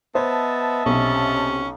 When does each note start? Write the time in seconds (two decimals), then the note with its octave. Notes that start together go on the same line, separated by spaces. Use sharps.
0.15 B3 C5 D#5 E5 A5
0.86 B1 C3 C#4